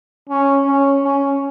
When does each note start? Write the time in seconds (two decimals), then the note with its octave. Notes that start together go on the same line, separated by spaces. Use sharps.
0.29 C#4
0.66 C#4
1.04 C#4